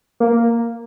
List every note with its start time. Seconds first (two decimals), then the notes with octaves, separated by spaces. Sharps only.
0.20 A#3